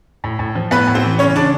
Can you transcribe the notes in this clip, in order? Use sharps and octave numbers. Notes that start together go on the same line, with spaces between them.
A2
A2
F3
A2 B3 B4
A2
C4 C5
E3
C#3 C#4 C#5
C#3 D4 D5